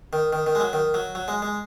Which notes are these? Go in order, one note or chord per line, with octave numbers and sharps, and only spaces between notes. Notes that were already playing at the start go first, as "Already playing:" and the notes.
D#3
D#3
D#3
G#3
F#3
D#3
F#3
F#3
G#3
G#3